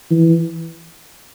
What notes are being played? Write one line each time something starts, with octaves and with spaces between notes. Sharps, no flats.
E3